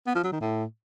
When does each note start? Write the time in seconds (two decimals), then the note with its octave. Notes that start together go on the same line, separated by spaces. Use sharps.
0.07 B3
0.15 F3
0.24 F#3
0.32 D#3
0.41 A2